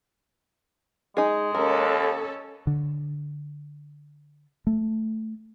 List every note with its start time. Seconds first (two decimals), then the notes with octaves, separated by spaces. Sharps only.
1.17 G#3 D#4 G#4
1.55 D#2 C#4 A4 A#4
2.67 D3
4.67 A3